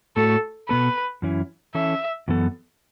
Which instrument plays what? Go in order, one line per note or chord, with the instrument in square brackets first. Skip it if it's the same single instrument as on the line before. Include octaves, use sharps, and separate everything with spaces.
[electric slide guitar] A2 A3 F#4 [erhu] A4
[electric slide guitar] B2 B3 A4 [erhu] B4
[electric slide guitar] F#2 E3 C#4 E4
[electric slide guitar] E3 C#4 A4 [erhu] E5
[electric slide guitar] F#2 E3 B3 A4